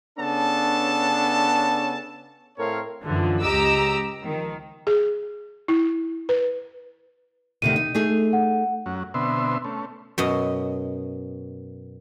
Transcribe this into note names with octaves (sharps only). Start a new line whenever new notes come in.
C#3 B3 C#4 D4 A4 A5
A2 A3 C4 A#4 C#5 F5
F#2 D3 E3 F3
C#2 G4 D#5 A#5 D6 E6
D#3 F3
G#4
E4
B4
D2 C3 D#3 D#7
D#4
A3 D#4 G#4
F#5
F#2 F#3 C#4
B2 D3 B3 C4 E5 C6
A3 C#4
F#2 B2 D#5